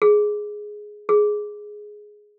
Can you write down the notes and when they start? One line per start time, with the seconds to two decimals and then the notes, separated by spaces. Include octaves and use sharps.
0.02 G#4
1.09 G#4